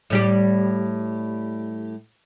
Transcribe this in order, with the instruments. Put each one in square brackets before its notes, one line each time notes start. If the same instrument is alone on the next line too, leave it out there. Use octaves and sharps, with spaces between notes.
[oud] A2 G3 G4